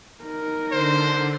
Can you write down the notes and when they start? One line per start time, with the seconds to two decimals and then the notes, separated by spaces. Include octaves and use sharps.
0.24 D#4 A#4
0.72 D3 C5